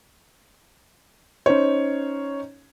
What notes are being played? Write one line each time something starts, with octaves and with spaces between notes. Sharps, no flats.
C#4 D#4 C5 C#5